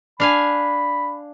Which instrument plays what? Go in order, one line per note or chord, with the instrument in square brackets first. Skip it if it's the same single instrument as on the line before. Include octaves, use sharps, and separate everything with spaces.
[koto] D4 F5 G#5 [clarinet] B5